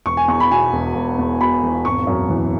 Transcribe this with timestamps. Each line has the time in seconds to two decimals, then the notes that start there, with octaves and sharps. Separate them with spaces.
0.06 E1 C#6
0.17 G#5
0.28 E2 C#6
0.40 B5
0.51 B2 G#5
0.73 E1
0.95 E1
1.19 E2
1.40 B2 B5
1.63 E1
1.85 G#1 C#6
2.07 F#2
2.30 E3